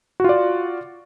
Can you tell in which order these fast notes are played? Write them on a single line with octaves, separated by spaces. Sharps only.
F#4 F4 D5